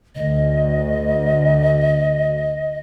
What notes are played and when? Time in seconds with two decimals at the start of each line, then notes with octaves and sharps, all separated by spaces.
0.15 D2 D#5